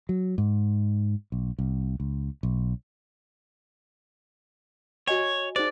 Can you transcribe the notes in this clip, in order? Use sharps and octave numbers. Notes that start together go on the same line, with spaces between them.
F#3
G#2
B1
C2
C#2
B1
F#4 C#5 D#5 G#5
D#4 G#4 C5 D5